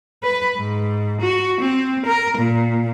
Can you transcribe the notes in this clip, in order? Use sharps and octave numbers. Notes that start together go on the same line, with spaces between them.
B4
G#2
F#4
C4
A#4
A#2